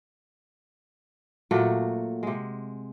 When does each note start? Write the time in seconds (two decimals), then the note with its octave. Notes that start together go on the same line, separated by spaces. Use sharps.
1.51 A#2 F#3 A3 F#4
2.23 C3 G#3